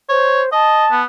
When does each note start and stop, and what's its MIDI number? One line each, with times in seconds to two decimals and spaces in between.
0.09 0.52 72
0.09 0.42 73
0.52 0.85 75
0.52 0.99 81
0.91 1.04 59